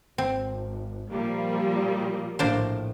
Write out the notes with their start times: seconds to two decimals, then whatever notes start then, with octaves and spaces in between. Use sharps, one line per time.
0.18 G#1 C4
1.11 A#2 F3 G3 A#3
2.39 A#1 A2 A#3 D4 C5